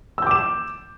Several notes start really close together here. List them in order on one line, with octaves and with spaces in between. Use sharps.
E6 G6 D6 E7